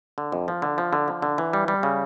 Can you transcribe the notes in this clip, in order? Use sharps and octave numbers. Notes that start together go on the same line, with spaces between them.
D3
F2
F3
D3
F3
D3
F3
D3
E3
G3
G3
C#3